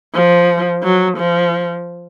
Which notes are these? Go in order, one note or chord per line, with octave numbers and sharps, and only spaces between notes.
F3
F#3
F3